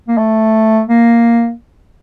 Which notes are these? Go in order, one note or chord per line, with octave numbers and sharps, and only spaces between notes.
A#3
A3
A#3